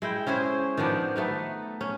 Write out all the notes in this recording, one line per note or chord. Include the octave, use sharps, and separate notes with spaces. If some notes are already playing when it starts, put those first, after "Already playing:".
G#3 E4 G5
C#4 E4 G#4 C5
D#3 F3 B3 D4
A3 B3 D#4
C#4